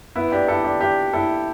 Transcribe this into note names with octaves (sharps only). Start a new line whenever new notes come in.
B3 E4
D4 G4
E4 A4
D4 G4
D4 G4
E4 A4